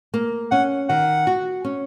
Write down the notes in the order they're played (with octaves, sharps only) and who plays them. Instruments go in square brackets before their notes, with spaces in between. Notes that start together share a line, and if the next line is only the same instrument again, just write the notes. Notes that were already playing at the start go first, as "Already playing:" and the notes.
[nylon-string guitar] A#3
[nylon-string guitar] C#4 [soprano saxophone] F#5
[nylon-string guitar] D#3 [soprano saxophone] F#5
[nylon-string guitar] F#4
C#4